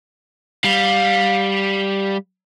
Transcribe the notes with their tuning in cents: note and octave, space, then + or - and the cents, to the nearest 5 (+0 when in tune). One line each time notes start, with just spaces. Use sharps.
G3 +0 F5 +20